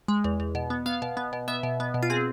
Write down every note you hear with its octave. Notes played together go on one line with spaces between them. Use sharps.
G#3
E2
E2
B2
B3
B3 F5
B2
B3
B2
B3 E5
B2
B3
B2
F4
C4 G#4